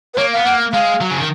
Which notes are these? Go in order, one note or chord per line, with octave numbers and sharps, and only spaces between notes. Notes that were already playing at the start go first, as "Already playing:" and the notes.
B4
A#3 C#5
B3 F5
A#3 F#5
G#3 F5
F#3
C#3
D#3